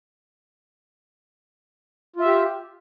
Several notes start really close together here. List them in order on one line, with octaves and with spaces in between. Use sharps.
F4 E5 G4